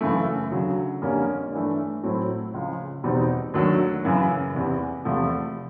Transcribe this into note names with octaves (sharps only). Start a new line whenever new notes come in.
F#2 C#3 E3 A3
D2 C#3 F#3
F2 D3 G3 A#3 C#4
G2 E3 A3
A2 F#3 A3 C4 E4
C#2 C#3 F3
E2 B2 G3 C4 D#4
D#2 D3 F#3 A3 D4
F#2 C#3 E3
E2 C3 E3
E2 C3 F3 A3